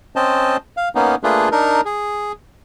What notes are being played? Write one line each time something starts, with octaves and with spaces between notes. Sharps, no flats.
C4 C#4 C5 D#5 A5
F5
A#3 B3 C#4 D#4
A3 A#3 D4 F4 G#4 B4
D4 D#4 A#4
G#4